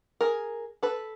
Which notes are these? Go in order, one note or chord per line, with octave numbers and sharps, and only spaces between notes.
G#4 A#4
A4 B4